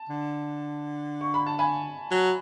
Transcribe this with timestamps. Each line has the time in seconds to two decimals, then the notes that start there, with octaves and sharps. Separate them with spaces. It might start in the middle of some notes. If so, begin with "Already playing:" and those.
Already playing: A5
0.09 D3
1.21 C#6
1.34 B5
1.46 A5
1.59 G#5 B5
2.11 F#3